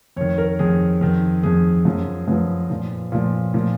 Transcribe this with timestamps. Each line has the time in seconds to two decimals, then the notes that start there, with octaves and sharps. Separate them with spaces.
0.16 F2 D#3 C#5
0.38 A#4
0.59 F2 D#3 G#4
1.01 F2 D#3
1.43 F2 D#3 G#4
1.85 F#2 F3
2.28 F#2 F3 B4
2.70 A#2 F3
3.12 A#2 F3
3.54 A#2 F3